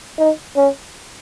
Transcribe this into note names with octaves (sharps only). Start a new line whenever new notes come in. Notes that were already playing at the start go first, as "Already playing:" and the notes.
D#4
C#4